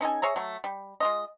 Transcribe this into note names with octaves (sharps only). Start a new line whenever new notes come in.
C#4 D#4 A4 G#5
G#4 C#5 E5 A#5
F#3 A3
G3
G#3 F4 D#5